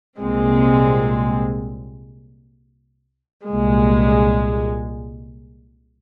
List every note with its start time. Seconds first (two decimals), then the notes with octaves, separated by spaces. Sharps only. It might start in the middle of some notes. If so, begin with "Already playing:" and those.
0.18 C2 A#2 G#3 C4
3.48 C2 A#2 G#3